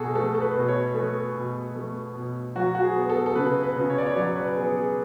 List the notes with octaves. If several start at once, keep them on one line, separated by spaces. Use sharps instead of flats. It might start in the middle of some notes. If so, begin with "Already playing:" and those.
Already playing: B2 F#4 G#4 A4
A3 A4
A4
B4
B2
C#5
A3 A4
B2
A3
B2
F#3 F#4
F#4
G#4
B3
A4
A4
C#3 B4
B4
C#3
C#5
D5
C#5
F#3 D5
C#5
B4
B3 G#4
G#4